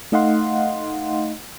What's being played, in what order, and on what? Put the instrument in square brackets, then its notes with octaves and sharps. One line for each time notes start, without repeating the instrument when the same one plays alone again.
[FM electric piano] A3 D#4 D#5 F5 F#5 C6